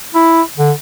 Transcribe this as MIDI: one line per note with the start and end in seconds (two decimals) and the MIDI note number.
0.15 0.42 64
0.58 0.72 50